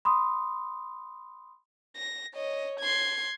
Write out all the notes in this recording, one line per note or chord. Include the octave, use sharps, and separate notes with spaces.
B5 C6 D#6
A#6
C#5 D#5
C6 G#6